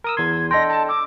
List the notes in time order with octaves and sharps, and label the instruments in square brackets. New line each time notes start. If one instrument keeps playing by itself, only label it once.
[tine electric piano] A#4 D#6 E6
[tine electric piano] E2 C6 [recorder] G#6
[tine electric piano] D4 A4 G5 [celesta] D#5 C6 [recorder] A#6
[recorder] A5
[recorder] D6 [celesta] E6